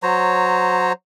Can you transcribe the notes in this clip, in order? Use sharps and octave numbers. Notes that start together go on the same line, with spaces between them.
F#3 C5 C#5 A#5